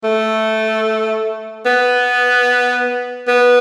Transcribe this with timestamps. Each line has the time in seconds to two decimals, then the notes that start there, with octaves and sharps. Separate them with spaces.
0.04 A3
1.66 B3
3.28 B3